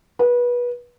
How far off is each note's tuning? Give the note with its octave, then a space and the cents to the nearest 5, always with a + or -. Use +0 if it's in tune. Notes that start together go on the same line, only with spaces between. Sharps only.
B4 -25